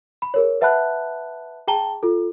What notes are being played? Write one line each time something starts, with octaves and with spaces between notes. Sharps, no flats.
B5
G#4 A#4 C#5
B4 E5 F#5 A5 B5 F#6
G#4 G5 A5 A#5 G7
F4 A4